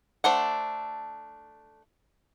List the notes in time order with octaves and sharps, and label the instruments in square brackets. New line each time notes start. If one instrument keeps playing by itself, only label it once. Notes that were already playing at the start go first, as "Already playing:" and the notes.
[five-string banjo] A3 D4 C5 F#5